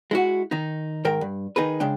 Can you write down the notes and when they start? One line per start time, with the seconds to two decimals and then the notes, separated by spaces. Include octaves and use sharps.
0.11 G#3 E4 F#4
0.51 D#3 D#4
1.05 G#2 D#3 A#4 G5
1.21 G2
1.56 D#3 D#4 G#4 B4
1.80 C#3 G#3 D4 G5